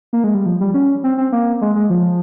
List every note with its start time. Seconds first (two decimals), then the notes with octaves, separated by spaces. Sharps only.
0.13 A#3
0.24 G#3
0.35 G3
0.46 F3
0.60 G3
0.74 C#4
1.04 C4
1.18 C4
1.32 A#3
1.61 G#3
1.75 G#3
1.90 F3